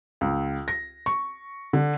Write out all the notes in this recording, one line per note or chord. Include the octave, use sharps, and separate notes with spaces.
C#2
A#6
C#6
D3